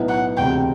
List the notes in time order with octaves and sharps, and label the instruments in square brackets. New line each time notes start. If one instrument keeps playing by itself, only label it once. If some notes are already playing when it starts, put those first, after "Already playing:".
Already playing: [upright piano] B1 A2 F#3 B3 E4
[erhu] F#5
[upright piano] E1 D2 C3 [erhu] G5